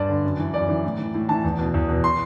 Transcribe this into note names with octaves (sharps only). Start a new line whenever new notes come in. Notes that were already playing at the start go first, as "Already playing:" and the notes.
Already playing: G2 D5
D3
F#2
E3
F#2 D5
E3
A2
E3
A2
E3 A5
E2
B2
E2
B2
C6